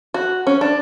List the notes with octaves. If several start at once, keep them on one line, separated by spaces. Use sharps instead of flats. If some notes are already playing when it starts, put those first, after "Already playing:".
F#4
C#4
D4